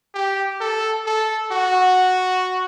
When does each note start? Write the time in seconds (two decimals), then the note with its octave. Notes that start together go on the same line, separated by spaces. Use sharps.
0.14 G4
0.61 A4
1.06 A4
1.51 F#4